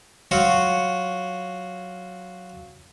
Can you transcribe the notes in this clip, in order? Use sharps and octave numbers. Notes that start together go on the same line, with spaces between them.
F#3 F4 F#4